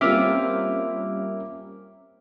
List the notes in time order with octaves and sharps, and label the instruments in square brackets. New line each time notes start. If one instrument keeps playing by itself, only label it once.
[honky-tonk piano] G3 A#3 C#4 [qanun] C4 F4 [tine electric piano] E5 D6 F6